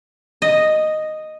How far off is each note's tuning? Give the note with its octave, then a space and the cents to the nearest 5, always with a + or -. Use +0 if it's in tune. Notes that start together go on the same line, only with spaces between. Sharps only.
D#5 -5